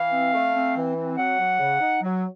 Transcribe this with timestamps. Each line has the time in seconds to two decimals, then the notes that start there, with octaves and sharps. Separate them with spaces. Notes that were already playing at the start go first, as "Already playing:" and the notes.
Already playing: E3 F5
0.13 C4
0.33 A3
0.55 C4
0.76 E3
0.96 C4
1.17 F#3 F#5
1.39 F#3
1.59 C#3
1.81 D#4
2.02 F#3